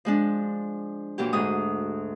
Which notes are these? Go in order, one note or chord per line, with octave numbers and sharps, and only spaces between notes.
F3 G#3 D4
A#2 E3 F#3 G4
D2 G#2 D#6